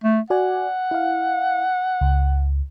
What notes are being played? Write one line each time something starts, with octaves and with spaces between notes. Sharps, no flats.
A3
F#4 D5 F#5 G#5
E4 F5
C#2